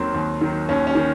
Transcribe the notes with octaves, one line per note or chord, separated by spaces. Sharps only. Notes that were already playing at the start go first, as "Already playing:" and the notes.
Already playing: D#2 D#3 F#3 C4
D#2
D#3 F#3
D#2 C#4
C#4
D#3